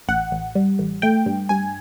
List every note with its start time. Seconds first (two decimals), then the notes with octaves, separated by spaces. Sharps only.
0.08 A1 F#5
0.32 A1
0.55 G3
0.79 A1
1.02 A3 G5
1.26 G2
1.49 G2 G#5